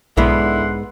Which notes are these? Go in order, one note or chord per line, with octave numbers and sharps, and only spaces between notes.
B1 G#2 D3 G#3 B3 E4 F#5 C6